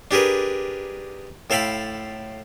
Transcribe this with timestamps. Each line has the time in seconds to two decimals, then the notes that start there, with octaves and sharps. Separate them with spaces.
0.11 D4 G4 G#4 A#4 B4
1.50 A2 A4 F5 G5 B5 C6